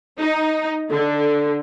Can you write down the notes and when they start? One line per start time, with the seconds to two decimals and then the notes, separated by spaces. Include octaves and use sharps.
0.19 D#4
0.91 D3